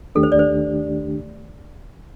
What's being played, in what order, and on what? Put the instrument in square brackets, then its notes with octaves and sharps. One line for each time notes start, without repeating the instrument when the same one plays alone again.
[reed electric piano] D#2 D#3 A3 D4 G4 [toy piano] A4
[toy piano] C5
D5
C5